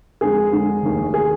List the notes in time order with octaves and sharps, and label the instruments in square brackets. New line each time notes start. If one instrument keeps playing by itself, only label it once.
[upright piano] F2 D3 G#3 G#4
F2 D3 G#3
F1 D#2 D#3
D#3 G#4